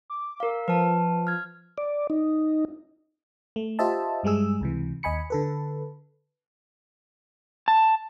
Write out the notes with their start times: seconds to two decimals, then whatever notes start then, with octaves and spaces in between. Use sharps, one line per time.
0.10 D6
0.40 A#4 F5
0.68 F3 B4 A5
1.27 F6 G#6
1.78 D5
2.10 D#4
3.56 A3
3.79 F4 G4 C5 D#5 E5 A5
4.23 G2 G3 G#3 G#4 E6
4.61 C#2 C3 E3
5.03 D#2 D#5 G#5 B5 C#7
5.30 D3 A4 B4
7.68 A5